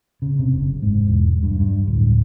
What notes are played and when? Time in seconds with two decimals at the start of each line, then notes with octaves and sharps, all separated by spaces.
0.22 C#3
0.39 C3
0.53 F#1
0.82 G#2
1.07 E1
1.43 G2
1.60 G2
1.88 D1